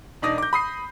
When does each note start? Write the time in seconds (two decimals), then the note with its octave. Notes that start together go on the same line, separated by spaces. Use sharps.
0.22 E1 D4 D#4 D6 D#6 A#6
0.38 D6 G6
0.53 B5 D#6 C7